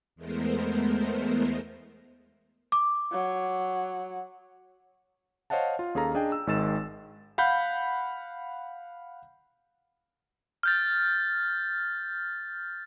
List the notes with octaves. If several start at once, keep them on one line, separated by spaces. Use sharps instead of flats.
E2 G#3 A3 B3 A#4 C5
D6
F#3
C5 C#5 D#5 F5 F#5 A5
F4
D#2 C#4 G#4 A4 F5 A#5
D4 G#4 D#5 G5
E6
G#1 D#3 G#3 E6 A6 E7
F5 F#5 B5 G6
F6 G6 A6